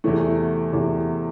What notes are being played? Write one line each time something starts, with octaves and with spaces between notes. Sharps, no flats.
E2 C3 E3 A3
E2 C3 E3